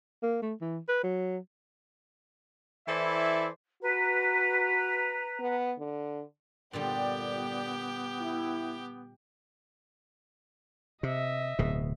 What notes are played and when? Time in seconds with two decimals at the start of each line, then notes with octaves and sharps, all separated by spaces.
0.23 A#3
0.42 A3
0.61 E3
0.89 B4
1.03 F#3
2.87 E3 E4 A4 C5 D5 E5
3.83 F#4 B4 A#5
5.39 B3
5.79 D3
6.73 G1 A#2 D3 G3 B3 G4 D5 G5
8.21 E4
11.03 C3 D#5 E5
11.59 D1 B2